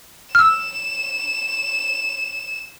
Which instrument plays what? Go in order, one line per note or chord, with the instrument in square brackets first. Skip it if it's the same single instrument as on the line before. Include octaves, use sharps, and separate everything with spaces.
[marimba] E6 F6 [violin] E7